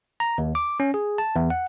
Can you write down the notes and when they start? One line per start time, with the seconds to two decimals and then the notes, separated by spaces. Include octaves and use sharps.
0.20 A#5
0.38 D#2
0.55 D6
0.80 C#4
0.94 G#4
1.18 A5
1.36 E2
1.50 F#5